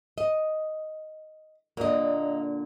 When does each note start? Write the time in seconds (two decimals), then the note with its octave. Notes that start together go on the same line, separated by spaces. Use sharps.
0.18 D#5
1.77 A#2 D3 A#3 D#5